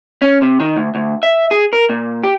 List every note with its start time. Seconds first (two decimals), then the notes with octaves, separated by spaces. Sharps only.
0.22 C#4
0.42 C3
0.60 D#3
0.77 D2
0.95 D2
1.23 E5
1.51 G#4
1.73 A#4
1.89 A#2
2.24 G4